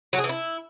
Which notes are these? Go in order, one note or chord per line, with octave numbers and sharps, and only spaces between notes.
F#3
G#4
E3
E4